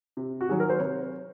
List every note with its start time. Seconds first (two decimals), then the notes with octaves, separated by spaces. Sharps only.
0.17 C3
0.41 F#4
0.49 D#3 F#3 G#4
0.60 A#4
0.69 C5
0.79 C3 C#5